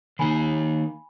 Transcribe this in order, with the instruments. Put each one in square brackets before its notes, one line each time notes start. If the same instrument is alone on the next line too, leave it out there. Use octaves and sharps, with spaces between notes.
[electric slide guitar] D#3 A#3 D#4 [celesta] G#5 B5